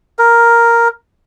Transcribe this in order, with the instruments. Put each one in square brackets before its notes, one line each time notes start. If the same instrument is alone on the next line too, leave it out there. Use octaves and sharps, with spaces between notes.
[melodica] A#4